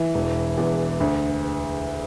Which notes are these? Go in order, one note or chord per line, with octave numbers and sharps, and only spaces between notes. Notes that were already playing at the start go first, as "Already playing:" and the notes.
Already playing: E3
E1
E2
D2